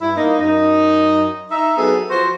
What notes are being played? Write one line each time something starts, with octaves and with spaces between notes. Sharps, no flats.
G2 E4
A#3 D#4
F#2 D#4
D#4 E5
F#3 B3 D#4 G#4 A4
F3 F#4 C5